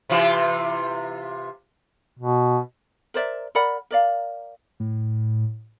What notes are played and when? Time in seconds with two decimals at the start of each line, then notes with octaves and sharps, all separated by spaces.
0.10 C3 E3 F4
2.19 B2
3.14 A#4 C5 D5 E5
3.55 A#4 D5 F#5 B5
3.91 A#4 D5 F5
4.80 A2